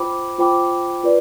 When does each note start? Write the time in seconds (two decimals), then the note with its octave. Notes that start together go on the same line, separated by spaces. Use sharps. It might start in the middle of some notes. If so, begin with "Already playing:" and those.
Already playing: F4 C5 G5 B5 D6
0.38 F4 C5 G5 B5 D6
1.03 F4 B4 D5